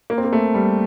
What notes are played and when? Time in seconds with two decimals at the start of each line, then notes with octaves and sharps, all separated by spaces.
0.10 A#3
0.18 C4
0.25 A#3
0.33 A3
0.54 G3